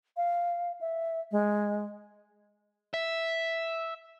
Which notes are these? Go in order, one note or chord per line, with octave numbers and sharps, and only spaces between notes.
F5
E5
G#3
E5